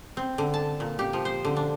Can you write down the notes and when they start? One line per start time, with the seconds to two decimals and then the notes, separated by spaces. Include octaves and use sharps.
0.17 C4
0.38 D3
0.54 A5
0.80 A#2
0.99 G4
1.13 F3
1.25 C5
1.45 D3
1.56 D4